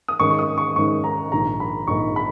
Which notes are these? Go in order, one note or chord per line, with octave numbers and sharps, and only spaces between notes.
D#6
G#2 D#3 G#3 C#4 C#6
C#6
D#6
C#6
G#2 D#3 G#3 C#4 C#6
A#5
A#1 G#2 D#3 A#5
B5
A#1 G#2 D#3 C#6
B5